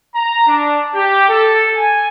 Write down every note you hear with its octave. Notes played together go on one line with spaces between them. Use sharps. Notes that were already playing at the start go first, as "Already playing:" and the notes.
A#5
D4
G4
A4
G#5